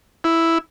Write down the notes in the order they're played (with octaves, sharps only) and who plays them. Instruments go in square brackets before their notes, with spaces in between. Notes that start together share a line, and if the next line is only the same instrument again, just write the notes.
[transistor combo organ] E4